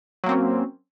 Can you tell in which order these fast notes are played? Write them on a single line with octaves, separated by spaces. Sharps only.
F#3 A#3 C4 C#4